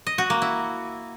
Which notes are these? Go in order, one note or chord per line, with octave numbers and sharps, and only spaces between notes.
D#5
F#4
A#3
E4